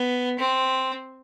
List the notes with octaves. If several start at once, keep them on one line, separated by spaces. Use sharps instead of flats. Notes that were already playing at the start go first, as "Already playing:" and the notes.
Already playing: B3
C4